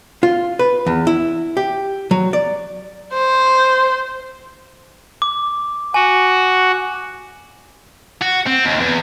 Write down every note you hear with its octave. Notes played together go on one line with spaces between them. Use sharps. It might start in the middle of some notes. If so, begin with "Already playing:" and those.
F4
B4
E2
E4
G4
F#3
D5
C5
D6
F#4 G#5
F#4
C4
D#2
E2